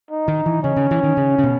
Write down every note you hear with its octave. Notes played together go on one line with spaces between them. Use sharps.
D#4
D#3
E3
C#3 C#4
C#3
E3
D#3
C#3
C#3
B2